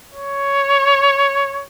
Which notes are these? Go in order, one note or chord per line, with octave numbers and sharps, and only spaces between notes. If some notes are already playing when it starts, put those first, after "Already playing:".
C#5